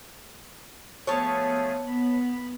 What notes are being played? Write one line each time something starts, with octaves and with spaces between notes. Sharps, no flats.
F3 A3 B3 G#4 C#5 A5
B3 B5